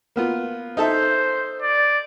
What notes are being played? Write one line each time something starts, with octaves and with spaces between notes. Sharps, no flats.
A#3 B3 F4
D#4 A4 C5 E5
D5